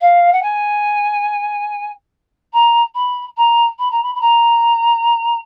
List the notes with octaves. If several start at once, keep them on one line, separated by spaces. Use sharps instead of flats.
F5
F#5
G#5
A#5
B5
A#5
B5
A#5
B5
B5
A#5